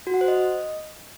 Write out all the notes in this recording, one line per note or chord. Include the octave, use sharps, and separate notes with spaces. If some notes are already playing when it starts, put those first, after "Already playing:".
F#4
F#5
C5
D#5